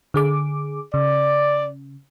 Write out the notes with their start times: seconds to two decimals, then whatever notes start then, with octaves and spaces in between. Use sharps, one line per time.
0.14 D3 G#4 D6
0.94 C#3 D5